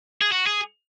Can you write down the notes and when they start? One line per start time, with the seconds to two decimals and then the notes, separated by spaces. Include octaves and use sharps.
0.22 G#4
0.32 F#4
0.47 G#4